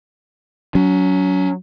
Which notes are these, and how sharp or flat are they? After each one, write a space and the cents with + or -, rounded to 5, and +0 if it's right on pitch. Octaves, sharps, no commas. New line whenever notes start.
F#3 +5 C#4 +35